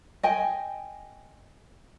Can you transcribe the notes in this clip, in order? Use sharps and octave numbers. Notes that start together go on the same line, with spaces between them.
D#5 G5 G#5